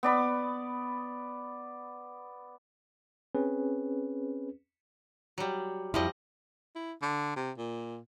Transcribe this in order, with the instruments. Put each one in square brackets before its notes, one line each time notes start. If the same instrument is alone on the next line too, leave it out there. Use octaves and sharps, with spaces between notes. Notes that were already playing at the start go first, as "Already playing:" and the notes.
[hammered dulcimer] B3 D5 B5
[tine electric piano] C4 C#4 G#4 B4
[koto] F#3 G3
[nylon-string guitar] F2 E4 [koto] F3 G3 D#5
[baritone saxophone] E4
D3
C3
A#2